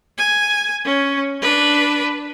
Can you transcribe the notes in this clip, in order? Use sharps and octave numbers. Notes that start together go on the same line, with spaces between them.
G#5
C#4
D4 B4